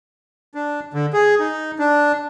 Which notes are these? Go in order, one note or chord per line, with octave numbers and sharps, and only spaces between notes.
D4
D3
G#4
D#4
D4